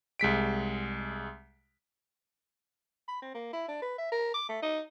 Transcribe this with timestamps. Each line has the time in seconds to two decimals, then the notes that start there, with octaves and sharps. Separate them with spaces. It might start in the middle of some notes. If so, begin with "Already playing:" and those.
0.19 C2 G#3 B6 D7
3.08 B5
3.22 C4
3.34 A#3
3.53 E4
3.68 D4
3.82 B4
3.98 E5
4.11 A#4
4.34 D6
4.49 A3
4.62 D#4